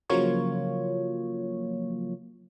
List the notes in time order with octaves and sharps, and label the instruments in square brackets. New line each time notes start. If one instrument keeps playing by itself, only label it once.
[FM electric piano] C#3 F3 F#3 A#3 F4 C#5